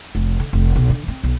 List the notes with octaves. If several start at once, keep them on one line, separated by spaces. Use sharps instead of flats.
F1
D3
F1
B1
D3
C4
B1